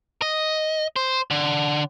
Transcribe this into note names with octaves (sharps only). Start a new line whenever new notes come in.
D#5
C5
D3